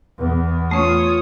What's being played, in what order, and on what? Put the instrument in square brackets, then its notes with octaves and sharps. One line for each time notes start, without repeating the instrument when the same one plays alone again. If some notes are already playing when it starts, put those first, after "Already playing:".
[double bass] E2 B3
[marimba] A3 C#4 [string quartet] F4 C#5 D#6